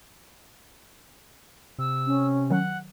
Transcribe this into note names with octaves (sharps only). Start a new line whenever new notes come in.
C3 E6
C#4
D#3 F#3 F#5